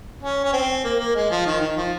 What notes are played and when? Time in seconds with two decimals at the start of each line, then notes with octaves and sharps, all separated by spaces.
0.23 C#4
0.44 C#4
0.53 C4
0.84 A#3
1.00 A#3
1.15 G#3
1.31 F3
1.46 D#3
1.61 D#3
1.76 F3